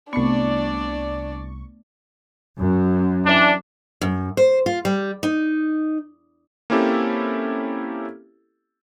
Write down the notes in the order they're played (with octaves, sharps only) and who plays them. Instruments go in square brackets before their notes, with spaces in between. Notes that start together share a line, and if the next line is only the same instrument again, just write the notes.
[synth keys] C2 C#6 [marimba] A3 B3 [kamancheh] D4 D5
[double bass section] F#2
[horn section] E3 D4
[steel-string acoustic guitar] F#2
C5
F4
G3
D#4
[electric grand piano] A#3 C4 C#4 E4 G4 A4